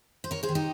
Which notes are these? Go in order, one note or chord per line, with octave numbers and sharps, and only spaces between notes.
C5
D#2 A#4 C#5
G#4 C5
D#3
D#4 G4